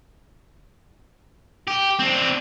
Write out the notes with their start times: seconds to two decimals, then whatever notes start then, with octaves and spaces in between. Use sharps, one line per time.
1.67 G4
1.99 C4 D4